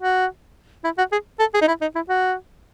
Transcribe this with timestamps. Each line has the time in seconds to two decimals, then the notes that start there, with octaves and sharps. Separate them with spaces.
0.01 F#4
0.84 E4
0.98 F#4
1.12 G#4
1.40 A4
1.54 G#4
1.62 D#4
1.68 E4
1.81 D#4
1.95 E4
2.09 F#4